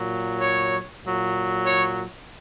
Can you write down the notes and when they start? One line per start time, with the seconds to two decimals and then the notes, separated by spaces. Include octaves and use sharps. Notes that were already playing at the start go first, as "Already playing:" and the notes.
Already playing: A#2 F#3
0.39 C#5
1.02 A#2 F#3
1.64 C#5